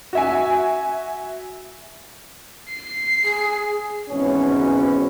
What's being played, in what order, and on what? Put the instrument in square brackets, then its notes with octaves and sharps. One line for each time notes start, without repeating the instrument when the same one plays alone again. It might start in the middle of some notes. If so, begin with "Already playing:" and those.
[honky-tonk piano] F#4 E5 G#5
[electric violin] C7
[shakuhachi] G#4
[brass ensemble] G#1 G#2 B2 E3 C#4